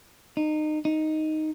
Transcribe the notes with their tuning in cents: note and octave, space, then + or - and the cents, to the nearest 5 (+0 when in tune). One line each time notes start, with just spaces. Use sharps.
D#4 -25
D#4 +0